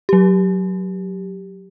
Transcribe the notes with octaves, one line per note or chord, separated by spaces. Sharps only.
F#3 G4